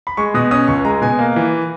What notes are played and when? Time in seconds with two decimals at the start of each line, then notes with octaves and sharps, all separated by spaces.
0.07 B5
0.17 G#3 C#6
0.34 B2 D#6
0.51 C#4 D#6
0.68 C#2 C#6
0.85 G#3 A#5
1.02 B2 G#5
1.19 A#3
1.36 E3